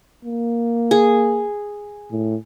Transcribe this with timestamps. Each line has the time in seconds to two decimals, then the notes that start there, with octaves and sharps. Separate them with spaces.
0.25 A#3
0.91 G#4
2.11 A2